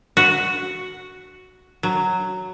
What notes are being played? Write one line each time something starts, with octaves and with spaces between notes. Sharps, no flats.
F#4
F#3